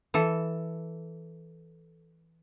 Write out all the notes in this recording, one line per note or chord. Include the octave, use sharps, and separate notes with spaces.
E3 A4